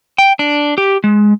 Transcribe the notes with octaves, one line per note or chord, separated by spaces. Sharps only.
G5
D4
G4
G#3